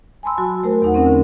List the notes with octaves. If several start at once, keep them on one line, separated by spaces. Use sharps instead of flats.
G#5 A5 B5 C6 E6
F#3 F#4
A3 A#4 C5
E2 D#4 F#5
C4 C#4 A#4 F#5
D3